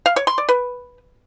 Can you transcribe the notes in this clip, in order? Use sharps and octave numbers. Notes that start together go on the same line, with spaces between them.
F5
C#5
C6
D5
B4